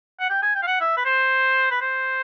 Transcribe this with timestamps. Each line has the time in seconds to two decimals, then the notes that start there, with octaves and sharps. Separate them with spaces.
0.20 F#5
0.30 G5
0.42 G#5
0.55 G5
0.63 F5
0.67 F#5
0.81 E5
0.97 B4
1.05 C5
1.71 B4
1.81 C5